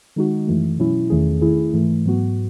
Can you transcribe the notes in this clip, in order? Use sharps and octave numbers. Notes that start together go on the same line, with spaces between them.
D#3 G#3 D#4 F#4
F#2 E3 A3
B2 F#3 C#4 E4
E2 D#3 A3 C#4 G#4
D#3 A3 E4 G#4
G#2 E3 A3
G#2 F#3 B3 F#4